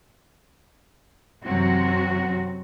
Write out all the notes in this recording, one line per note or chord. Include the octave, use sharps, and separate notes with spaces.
F#2 C3 E3 F#3 C4 F#4